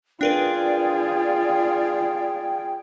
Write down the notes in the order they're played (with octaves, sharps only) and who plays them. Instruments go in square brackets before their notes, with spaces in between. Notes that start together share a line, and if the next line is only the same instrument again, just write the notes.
[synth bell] D4 A#4 B4 [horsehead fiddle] F4 G#4 [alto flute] D5 [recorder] G5